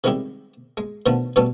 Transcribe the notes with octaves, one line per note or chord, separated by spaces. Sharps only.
C3 D#3 G3 G#3 E4 G4
G#3
B2 D3 D#3 F3 A3
B2 E3 G3 A3 C#4 A4